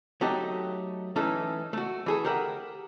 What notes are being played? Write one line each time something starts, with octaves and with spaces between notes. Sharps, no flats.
F#3 A3 D#4 G4
E3 A3 C#4 D#4 A4
A3 F#4
E3 G#4 A4
G4 A#4 E5 F#5